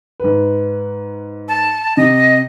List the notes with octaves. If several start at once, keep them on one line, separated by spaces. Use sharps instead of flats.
G#2 B4
A5
C3 D#5